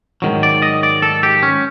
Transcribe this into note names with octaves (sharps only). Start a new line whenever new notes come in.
G#2 D#3 F#3
D5
D#5
D5
A4
G4
C#4